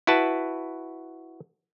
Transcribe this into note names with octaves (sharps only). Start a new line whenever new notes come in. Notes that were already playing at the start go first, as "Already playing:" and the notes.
E4 F#4 B4 A5